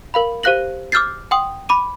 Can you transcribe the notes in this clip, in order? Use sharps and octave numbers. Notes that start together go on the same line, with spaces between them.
A#4 F5 B5
G4 C5 F5 F#6 A#6 F#7
D6 E6 F6 G6 A6 C7
F#5 G5 C6 D#6
B5 D6 D#7